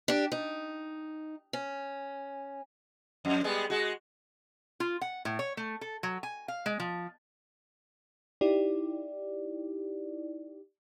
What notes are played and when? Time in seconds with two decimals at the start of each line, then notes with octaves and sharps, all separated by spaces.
0.08 D4 G4
0.32 D#4
1.53 C#4
3.25 F2
3.44 G3 G#3 B3
3.70 G#3 F#4
4.80 F4
5.01 F#5
5.25 A2
5.39 C#5
5.57 A3
5.81 A4
6.03 F#3
6.23 G#5
6.48 F5
6.66 G#3
6.80 F3
8.41 D#4 E4 G4 D5